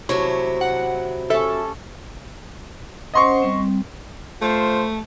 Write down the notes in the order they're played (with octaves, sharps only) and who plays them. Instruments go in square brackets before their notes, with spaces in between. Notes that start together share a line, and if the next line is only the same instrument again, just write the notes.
[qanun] C3 A3 C6 [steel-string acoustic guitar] F#3 E4 [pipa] C#5
[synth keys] F#5
[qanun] G3 C#4 [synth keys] A4 [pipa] E5
[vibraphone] C#4 C5 F#5 [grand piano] D#5 C6 C#6
[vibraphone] G3 C4
[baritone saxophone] A3 [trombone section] F4 C5